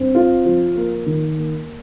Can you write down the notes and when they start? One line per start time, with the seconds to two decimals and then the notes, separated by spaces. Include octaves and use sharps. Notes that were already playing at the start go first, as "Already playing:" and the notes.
Already playing: G2 C4
0.15 F4
0.45 F3
0.76 A#3
1.06 D#3
1.37 A#3